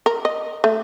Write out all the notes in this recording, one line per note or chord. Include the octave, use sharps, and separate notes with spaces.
A#4
D#5
A3